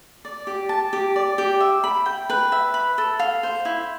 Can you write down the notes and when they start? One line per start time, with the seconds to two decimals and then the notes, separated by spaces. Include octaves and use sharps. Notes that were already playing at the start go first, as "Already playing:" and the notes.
0.25 D5
0.47 G4
0.69 A5
0.93 G4
1.16 D5
1.38 G4
1.60 E5
1.84 B5
2.06 G5
2.30 B4
2.52 E5
2.74 B5
2.98 A4
3.19 F5
3.43 C5
3.65 E4